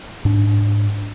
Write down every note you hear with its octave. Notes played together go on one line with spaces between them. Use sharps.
G#2 D4